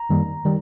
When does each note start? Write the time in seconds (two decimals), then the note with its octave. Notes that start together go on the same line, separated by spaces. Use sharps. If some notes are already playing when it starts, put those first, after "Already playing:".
Already playing: A#5
0.09 F#2 D#3 G3 A#3
0.45 D#3 G3